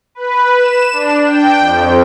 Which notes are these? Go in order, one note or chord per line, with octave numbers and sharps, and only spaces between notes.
B4
E7
D4
G5
F2